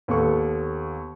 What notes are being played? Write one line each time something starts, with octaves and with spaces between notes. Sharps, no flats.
D#2 B3 A4 C#6